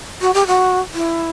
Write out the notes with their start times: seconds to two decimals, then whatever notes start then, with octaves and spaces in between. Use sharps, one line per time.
0.21 F#4
0.34 G4
0.47 F#4
0.94 E4